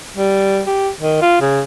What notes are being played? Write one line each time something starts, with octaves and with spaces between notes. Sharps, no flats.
G3
G4
D#3
F4
C#3